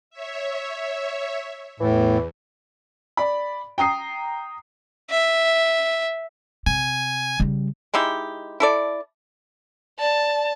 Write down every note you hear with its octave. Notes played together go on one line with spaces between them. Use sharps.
C#5 E5
E2 A2 E3
D5 B5
G5 A#5 D#6 C7
E5
C3 G#5
C#3 G3
G#3 D#4 E4 G4
E4 A4 D5
D5 A5